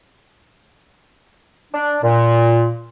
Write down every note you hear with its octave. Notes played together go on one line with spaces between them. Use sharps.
D4
A#2